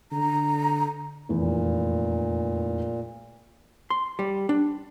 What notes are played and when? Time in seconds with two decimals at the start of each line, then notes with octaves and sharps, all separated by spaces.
0.12 D3 A#5
1.29 F1 E2 A#2
3.90 C6
4.19 G3
4.49 D4